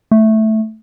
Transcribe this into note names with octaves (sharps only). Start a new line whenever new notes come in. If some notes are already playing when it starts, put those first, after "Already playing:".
A3